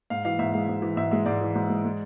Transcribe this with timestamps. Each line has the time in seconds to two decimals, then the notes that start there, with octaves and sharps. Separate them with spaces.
0.10 G#2 F5
0.25 E3 F5
0.39 G#2 E5
0.54 G#3 F5
0.69 G#2
0.82 E3
0.97 G#2 E5
1.11 G#3 E5
1.26 G#2 D5
1.41 E3
1.55 G#2
1.69 G#3
1.85 G#3